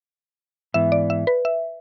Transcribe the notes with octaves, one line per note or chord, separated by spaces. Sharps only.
G#2 E3 B3 E5
D5
E5
B4
E5